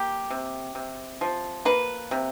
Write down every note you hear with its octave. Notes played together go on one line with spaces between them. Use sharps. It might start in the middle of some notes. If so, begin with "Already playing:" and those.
Already playing: A#3 G4
C3
C3
F3
A#3 B4
C3